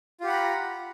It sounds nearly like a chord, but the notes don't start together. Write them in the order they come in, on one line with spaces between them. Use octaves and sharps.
F4 G4 F#5 B5 A#5